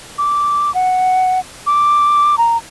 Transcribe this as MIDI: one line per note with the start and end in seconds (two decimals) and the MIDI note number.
0.18 0.73 86
0.75 1.40 78
1.67 2.36 86
2.38 2.57 82